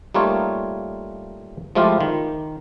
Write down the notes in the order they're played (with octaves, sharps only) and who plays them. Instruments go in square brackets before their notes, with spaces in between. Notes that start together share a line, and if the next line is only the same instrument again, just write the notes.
[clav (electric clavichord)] G3 A3 A#3 D#4 F4 C#5
F3 G#3 A3 E4 F4 G4
D#3